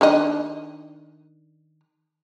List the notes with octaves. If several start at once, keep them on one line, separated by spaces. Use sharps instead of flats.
D#3 D4 D#5